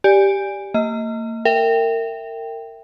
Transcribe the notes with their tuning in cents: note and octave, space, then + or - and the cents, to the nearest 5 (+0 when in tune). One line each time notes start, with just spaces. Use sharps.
G4 +0 D5 +0 G#5 -20
A#3 -35 D#5 +30
A#4 -30 E5 +0 G5 +0